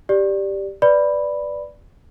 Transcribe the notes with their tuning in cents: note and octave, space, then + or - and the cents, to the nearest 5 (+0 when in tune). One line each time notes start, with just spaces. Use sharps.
G4 +0 D5 +0
B4 +0 D5 +0 B5 +0